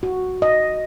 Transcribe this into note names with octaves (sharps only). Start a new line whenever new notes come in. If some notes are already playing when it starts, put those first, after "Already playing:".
F#4
D#5